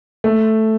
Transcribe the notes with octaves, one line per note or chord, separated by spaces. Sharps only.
A3